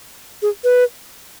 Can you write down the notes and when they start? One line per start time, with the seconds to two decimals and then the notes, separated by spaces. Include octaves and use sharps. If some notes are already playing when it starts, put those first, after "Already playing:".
0.42 G#4
0.64 B4